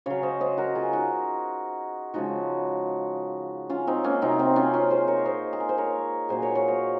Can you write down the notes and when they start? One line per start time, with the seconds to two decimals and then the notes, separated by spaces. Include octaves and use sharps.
0.06 C#3 F#3 C#5 F5
0.23 C5 D#5
0.41 C5 D#5
0.58 F#4 A#4
0.75 F4 G#4
0.93 D#4 F#4
2.14 C#3 F3 G#3 D#4 F#4
3.70 C#4 F4
3.87 C4 D#4
4.04 A#3 C#4
4.22 C3 F#3 C4 D#4
4.39 C4 D#4
4.56 C#4 F4
4.73 C#4 F4
4.91 G#4 C5
5.08 A#4 C#5
5.26 C5 D#5
5.53 G#4
5.60 A#4
5.69 C5
5.78 A#4 C#5
6.29 A#2 F#3 G#4 C5
6.42 A#4 C#5
6.55 C#5 F5
6.68 C5 D#5